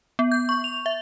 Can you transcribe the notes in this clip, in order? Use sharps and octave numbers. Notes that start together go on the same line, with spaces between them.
B3
G6
C#6
F7
E5